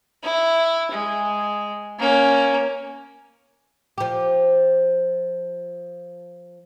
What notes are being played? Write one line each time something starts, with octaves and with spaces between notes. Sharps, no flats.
E4
G#3
A#3 C#4
F3 G4